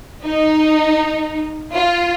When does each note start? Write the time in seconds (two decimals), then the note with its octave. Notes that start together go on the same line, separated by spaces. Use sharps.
0.24 D#4
1.72 F4